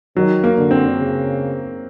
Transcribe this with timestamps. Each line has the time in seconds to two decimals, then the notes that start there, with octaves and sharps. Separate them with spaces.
0.16 D#3 F#3
0.44 A#3
0.57 D3
0.71 C4
0.99 C#3